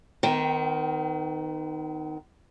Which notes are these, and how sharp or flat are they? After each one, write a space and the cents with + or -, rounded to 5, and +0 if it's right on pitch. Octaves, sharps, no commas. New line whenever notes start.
D#3 +0 B3 +45 G5 +0